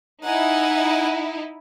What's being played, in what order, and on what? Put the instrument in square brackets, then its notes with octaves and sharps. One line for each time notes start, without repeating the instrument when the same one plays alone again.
[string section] D#4 E4 [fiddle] F#5 G#5